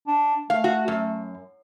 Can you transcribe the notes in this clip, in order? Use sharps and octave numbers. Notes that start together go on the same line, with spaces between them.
D4
A3 F5
F#4
F#2